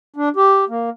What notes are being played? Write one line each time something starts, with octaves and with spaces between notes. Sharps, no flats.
D4
G4
A#3